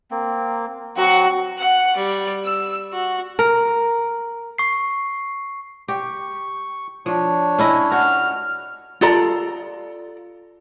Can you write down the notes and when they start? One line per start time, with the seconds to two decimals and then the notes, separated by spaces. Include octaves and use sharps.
0.11 A#3 C4
0.97 F#3 C4 F#4 F#5
1.58 F#5
1.96 G3
2.43 E6
2.90 F#4
3.39 A#4
4.58 C#6 C7
5.88 G4 C#6
7.06 F3 D4 C#5
7.59 C#4 E4 D#5
7.92 F#4 F6
9.01 F4 A4 D5 A#5